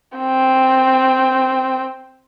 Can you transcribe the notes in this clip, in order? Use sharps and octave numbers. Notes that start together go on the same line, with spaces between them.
C4 G5